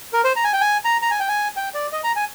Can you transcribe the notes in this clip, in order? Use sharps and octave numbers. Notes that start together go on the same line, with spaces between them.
A#4
C5
A#5
G#5
G5
G#5
A#5
A#5
G#5
G5
G#5
G5
D5
D#5
A#5
G#5